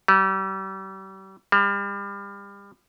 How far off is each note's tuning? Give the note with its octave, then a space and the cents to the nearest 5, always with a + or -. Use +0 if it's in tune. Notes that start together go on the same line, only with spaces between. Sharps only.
G3 -35
G3 +35